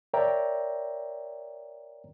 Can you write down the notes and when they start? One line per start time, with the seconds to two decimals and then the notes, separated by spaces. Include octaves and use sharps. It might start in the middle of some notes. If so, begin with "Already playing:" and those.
0.14 A#4 C#5 D5 E5 G5 A#5